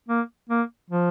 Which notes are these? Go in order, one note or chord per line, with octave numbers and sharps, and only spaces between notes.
A#3
A#3
F3